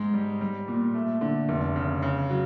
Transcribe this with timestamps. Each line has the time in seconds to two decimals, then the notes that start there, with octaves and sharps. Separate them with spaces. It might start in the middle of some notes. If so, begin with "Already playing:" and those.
Already playing: G#2 G#3
0.14 G3
0.41 G3
0.68 A#2
0.95 A3
1.21 D3
1.49 F1
1.76 C#3
2.02 C#3
2.30 F#3